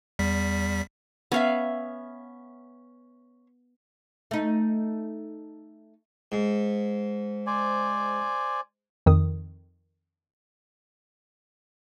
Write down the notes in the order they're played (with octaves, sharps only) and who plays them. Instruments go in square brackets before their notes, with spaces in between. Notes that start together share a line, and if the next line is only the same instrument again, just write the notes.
[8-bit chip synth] E2 G3 B6
[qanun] B3 F5 [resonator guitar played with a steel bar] C#4 E5
[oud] A3 D#4
[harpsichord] G#2
[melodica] C5 D5 G#5
[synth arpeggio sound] F2 D#3 D#6